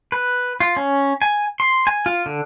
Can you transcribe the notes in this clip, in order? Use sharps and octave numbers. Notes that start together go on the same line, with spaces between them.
B4
F4
C#4
G#5
C6
G#5
F4
D3